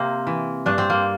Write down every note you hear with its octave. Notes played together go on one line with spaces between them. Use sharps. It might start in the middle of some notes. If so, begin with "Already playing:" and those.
Already playing: C3 A#3 C4
E3
G2 D4
C4
A#3